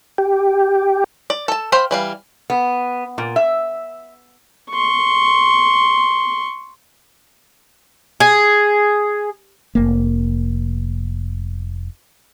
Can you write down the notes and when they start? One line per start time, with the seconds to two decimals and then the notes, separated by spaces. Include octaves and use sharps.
0.18 G4
1.30 D5
1.48 A4 A5
1.72 C5 F5 G5 B5
1.91 E3 G3 F5
2.50 B3
3.18 A#2
3.36 E5
4.71 C6 C#6
8.20 G#4
9.75 F1 A#3